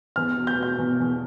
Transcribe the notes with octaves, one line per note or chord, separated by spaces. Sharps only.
E2 F6
B2
G6
B2 G6
E2
E2